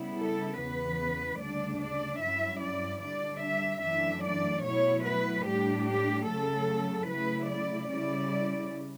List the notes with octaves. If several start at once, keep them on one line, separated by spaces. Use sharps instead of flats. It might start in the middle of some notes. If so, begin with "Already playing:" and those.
Already playing: C#3 G3 B3 E4
A4
E2 C#3 E3 B3 B4
D2 C#3 G3 D4 D5
D5
G2 F#3 C#4 E4 E5
D5
D3 G3 D4 D5
E5
F#2 E3 A3 D4 E5
D5
B2 F#3 A3 E4 C#5
B4
A2 G3 D4 G4
G4
C#3 F#3 A3 A4
C#3 F#3 A3 E4 B4
D5
C#3 G3 C#4 E4 D5